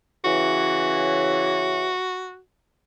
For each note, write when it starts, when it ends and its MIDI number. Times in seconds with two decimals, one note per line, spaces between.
0.24 1.93 49
0.24 1.93 52
0.24 2.40 66